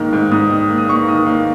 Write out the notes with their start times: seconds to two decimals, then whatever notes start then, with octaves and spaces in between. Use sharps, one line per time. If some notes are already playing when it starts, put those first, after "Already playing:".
Already playing: G#2 D#3 A#3
0.13 G#2
0.31 G#2 D#6
0.50 D#3 D#6
0.69 A#3
0.78 D#6
0.89 A#3 C#6
1.08 D#3 D#6
1.26 A#3